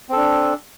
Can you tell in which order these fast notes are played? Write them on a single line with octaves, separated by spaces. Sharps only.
C4 A4 D4